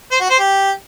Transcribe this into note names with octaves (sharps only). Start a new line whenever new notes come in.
C5
F#4
C5
G4